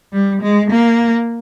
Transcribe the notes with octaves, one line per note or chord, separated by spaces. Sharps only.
G3
G#3
A#3